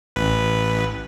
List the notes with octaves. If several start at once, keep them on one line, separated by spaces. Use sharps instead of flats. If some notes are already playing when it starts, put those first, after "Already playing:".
A1 B4